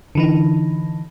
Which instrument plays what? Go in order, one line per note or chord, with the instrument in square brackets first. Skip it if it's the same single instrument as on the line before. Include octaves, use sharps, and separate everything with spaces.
[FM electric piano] D3 E3 D#4